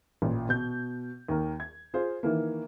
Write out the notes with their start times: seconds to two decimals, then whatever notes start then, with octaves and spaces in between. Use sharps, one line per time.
0.22 A1 A#2
0.49 B2 G6
1.28 D#2 A#4
1.60 G#6
1.94 F4 G#4 C5
2.23 D#3 E3 A#3